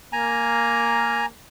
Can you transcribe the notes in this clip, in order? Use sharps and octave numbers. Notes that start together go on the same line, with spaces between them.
A#3 G#5 A#5